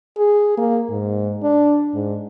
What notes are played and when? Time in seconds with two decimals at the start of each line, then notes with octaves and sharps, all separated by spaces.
0.17 G#4
0.58 A#3
0.90 G#2
1.43 D4
1.94 G#2